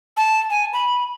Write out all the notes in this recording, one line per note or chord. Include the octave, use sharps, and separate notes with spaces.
A5
G#5
B5